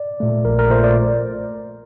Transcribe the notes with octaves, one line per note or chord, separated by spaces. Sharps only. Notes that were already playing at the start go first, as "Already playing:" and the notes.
Already playing: D5
A#2 A3
A#1 A#4
A#4
A#2 A3 C5
D5